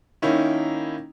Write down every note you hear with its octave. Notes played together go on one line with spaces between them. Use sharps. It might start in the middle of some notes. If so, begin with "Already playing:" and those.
D#3 A#3 C#4 D#4 E4